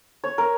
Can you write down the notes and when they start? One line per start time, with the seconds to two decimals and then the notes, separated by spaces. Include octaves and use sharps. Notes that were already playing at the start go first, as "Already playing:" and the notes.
0.24 C#5
0.38 A#4